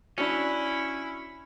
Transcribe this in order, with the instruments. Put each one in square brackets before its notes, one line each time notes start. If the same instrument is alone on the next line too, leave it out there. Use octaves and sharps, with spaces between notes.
[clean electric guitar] C#4 [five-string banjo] D4 F#4 [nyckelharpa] E4